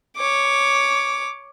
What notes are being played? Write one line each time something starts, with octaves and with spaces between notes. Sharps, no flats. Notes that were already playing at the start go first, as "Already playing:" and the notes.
C#5 D6